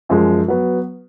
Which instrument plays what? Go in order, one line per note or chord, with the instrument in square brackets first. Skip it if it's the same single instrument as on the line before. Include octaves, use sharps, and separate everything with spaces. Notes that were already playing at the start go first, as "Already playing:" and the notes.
[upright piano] F#2 F3 G#3
F#3 B3